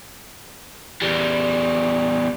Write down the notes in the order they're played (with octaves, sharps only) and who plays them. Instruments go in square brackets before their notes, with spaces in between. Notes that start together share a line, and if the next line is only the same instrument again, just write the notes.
[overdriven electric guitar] E2 G3